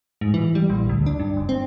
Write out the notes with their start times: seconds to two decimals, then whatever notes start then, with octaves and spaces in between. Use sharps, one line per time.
0.21 G#2
0.34 E3
0.55 G3
0.70 A#1
0.89 D2
1.06 D4
1.19 G2
1.37 F#1
1.49 C4